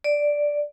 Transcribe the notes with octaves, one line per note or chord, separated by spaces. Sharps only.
D5